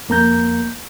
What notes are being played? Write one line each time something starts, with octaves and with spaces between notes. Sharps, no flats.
F2 A#3 A#5 G6